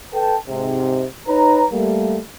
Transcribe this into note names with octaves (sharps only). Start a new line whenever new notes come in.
A4 B4 G5 A5
G#2 C3
D#4 B4 C#5 A#5
G3 A3 A#3